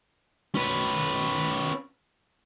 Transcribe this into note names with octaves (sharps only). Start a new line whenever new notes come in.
C#4 B4